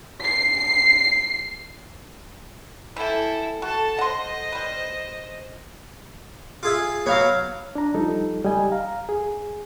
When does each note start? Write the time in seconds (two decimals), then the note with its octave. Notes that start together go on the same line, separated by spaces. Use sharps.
0.23 C7
2.97 E3 E4 A4 G5
3.62 F#4 A4 A5
3.99 C5 D#5 F#5 C6
4.52 G3 B4
6.63 F4 G#4 E5
7.06 F#3 B3 C#5 F5
7.75 D4 A#5
7.94 F3 G3 D#4 A4
8.44 C#2 G3 D#5 G#5
8.72 F5 A#5
9.09 G#4